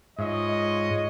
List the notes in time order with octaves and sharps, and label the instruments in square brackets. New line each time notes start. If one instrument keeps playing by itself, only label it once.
[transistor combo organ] G#2 [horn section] F4 C#5 D#5